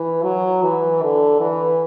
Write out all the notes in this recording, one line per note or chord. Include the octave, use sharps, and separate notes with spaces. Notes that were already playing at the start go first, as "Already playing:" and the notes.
Already playing: E3
F#3
E3
D3
E3